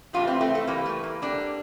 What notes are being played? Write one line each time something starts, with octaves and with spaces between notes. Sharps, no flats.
A2 E3 G3 D4 F4
C4 E4
A3 C4
A3
A2 E3 G3 A#3
A3
A#3
D3 G3 A#3 D4